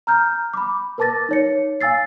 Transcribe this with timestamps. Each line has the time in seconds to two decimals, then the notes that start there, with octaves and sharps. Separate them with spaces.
0.07 A#5 F6 G6
0.54 B5 D6
0.98 A#4 B4 A5 D6 A6 A#6
1.29 D#4 C#5 C#7
1.81 F5 G#5 E6 A6 C7